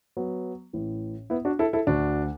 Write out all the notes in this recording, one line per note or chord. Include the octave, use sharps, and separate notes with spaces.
F#3 B3
A1 A2 E3
B3 E4
D4 F#4
E4 A4
E4 A4
D2 D3 D4 F#4